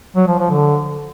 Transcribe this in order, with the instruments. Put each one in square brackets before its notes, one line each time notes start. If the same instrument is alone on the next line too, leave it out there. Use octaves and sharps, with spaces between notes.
[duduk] F#3
F3
F3
D3